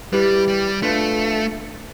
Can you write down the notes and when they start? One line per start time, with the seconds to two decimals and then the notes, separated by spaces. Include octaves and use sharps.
0.13 G3 E4 G4 B4
0.48 G3
0.82 A3 D4 F4 B4 F5